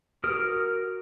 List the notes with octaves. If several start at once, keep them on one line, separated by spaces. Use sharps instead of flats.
F#4 A#4 D#6 F6